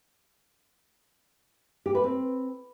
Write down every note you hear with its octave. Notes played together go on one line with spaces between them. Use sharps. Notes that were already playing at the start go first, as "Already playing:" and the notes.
G4
B4
C4